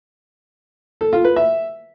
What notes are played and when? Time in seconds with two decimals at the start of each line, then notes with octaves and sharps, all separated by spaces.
1.01 A4
1.13 F4
1.25 B4
1.36 E5